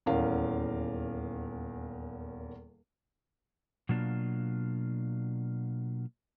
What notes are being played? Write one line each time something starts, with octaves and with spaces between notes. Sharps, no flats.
D#1 E2 C#4 A#4 F5
B2 F#3 A#3 D4 F4